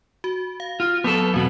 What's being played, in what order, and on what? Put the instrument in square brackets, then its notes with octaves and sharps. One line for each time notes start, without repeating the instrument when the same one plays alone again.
[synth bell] F#4
F5
[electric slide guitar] F4
[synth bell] F#3 A5 [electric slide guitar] B3 A4
[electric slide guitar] E2 B2 B3 [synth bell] C4 F#4 F#7